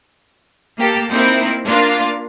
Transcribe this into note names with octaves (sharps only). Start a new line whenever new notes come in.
A#3 G4 A4
A#3 C4 D#4 E4
A#3 D4 F4 F5